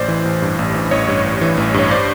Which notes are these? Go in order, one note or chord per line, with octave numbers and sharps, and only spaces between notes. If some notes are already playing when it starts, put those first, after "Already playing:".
Already playing: A1 C5 D5
E3
A1
G2
A1
E3
A1 C#5 D#5
G2
A1
E3
A1
G2 C#5
C5 D5